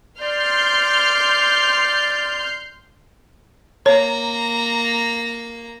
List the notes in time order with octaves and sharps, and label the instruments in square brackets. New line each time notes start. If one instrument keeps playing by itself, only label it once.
[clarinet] D5 [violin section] C6 F6 G6
[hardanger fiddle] A#3 A#5 [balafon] C#5